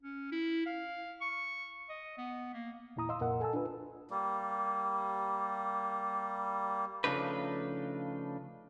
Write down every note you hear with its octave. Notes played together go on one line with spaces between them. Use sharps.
C#4
E4
F5
C#6
D#5
B3
A#3
E2 A#2 E4 A#5 D#6
D#5 F5 C6 E6
C2 F2 A#2 A#4 D#5 F#5
A4 G#5 A5 E6
D4 F4 B4
G3 A#3
C#3 F3 A3 D4 D#4 B4